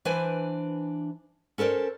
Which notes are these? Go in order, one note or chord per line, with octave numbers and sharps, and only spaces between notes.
E3 D4 B4 C5 G#5
C#4 A4 A#4 C5 D5